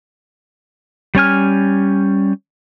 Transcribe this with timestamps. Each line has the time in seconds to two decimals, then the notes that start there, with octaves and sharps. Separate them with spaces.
1.15 G3 C#4 G#5 F6